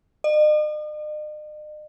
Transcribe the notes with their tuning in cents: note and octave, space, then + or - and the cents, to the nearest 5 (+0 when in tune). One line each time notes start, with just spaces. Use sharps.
D#5 -45